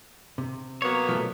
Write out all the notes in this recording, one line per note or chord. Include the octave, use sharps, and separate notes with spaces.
C3
F#3 A#3 B3 C#5
B1 F3 A3